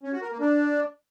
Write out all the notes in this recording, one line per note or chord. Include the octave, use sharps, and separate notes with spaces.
C#4
F#4
A#4
A#3
D4